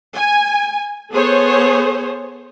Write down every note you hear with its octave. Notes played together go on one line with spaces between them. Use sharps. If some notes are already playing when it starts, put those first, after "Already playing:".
G#5
B3 G#4 A4 C5 C#5